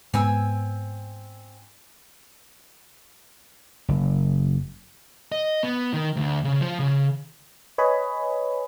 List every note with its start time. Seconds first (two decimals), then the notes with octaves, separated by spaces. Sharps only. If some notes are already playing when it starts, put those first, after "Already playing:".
0.14 G#2 B3 C4 G#5 E6
3.88 F#1
5.32 D#5
5.63 B3
5.93 D#3
6.16 D2
6.44 C#3
6.61 F3
6.79 C#3
7.78 B4 C#5 D#5 G#5 B5